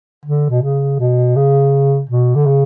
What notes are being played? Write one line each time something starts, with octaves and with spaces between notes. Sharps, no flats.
D3
B2
C#3
B2
C#3
B2
D3
C#3